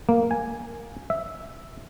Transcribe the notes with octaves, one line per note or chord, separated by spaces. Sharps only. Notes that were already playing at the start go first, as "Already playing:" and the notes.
A#3
G#5
E5